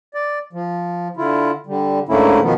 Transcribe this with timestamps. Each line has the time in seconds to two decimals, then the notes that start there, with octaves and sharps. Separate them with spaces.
0.14 D5
0.53 F3
1.17 D3 E4 F4
1.67 D3 G3
2.09 G#2 D3 A3 A#3 C#4 E4
2.43 B2 D#3 F3 B3